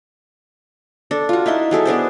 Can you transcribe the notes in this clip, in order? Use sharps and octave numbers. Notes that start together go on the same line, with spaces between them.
D4 A4
F4 F#4
D#4 E4 E5 C6
F#3 G#4 A4 E5
B3 D4 G#4 C5